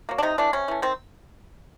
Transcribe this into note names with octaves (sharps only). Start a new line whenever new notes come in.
F#3 A#3
D4
C3 D#4
E3 A3 D4
C3 C#4
E3 A3
D#3 C4